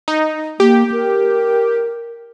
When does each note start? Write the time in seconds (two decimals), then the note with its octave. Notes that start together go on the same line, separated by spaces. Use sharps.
0.08 D#4
0.60 A#3 G4
0.92 A#4